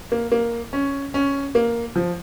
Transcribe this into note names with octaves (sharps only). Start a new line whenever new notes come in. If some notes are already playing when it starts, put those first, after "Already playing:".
A#3
A#3
C#4
C#4
A#3
F3